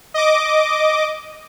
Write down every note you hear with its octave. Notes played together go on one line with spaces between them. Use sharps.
D#5 D6